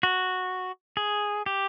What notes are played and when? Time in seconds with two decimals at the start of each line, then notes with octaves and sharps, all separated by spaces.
0.03 F#4
0.97 G#4
1.46 G4